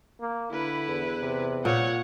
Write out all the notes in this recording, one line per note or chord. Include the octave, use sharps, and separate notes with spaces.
A#3
D3 E4 B4
E2
C3
A#2 C#5 F#5